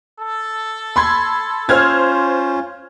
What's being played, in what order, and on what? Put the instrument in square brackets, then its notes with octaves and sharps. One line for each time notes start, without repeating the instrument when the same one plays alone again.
[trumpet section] A4
[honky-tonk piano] B5 C6 G#6
[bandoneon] C#4 F4 [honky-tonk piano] C5 F6 G#6